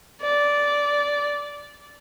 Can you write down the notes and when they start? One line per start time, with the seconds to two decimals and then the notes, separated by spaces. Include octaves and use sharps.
0.21 D5